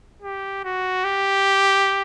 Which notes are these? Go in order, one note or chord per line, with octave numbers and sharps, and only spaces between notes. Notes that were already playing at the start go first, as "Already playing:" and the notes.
G4
F#4
G4